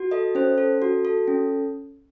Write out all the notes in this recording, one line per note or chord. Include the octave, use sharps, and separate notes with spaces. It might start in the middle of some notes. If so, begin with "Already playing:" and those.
Already playing: F#4
A4 D#5
C#4 C5
A4
F#4
A4
C#4